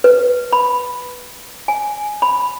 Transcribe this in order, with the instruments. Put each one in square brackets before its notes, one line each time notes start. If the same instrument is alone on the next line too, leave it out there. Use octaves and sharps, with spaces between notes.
[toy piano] B4
B5
G#5
B5